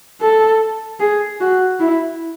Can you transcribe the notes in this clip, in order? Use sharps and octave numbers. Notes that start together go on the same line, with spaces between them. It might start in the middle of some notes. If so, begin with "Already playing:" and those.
A4
G#4
F#4
E4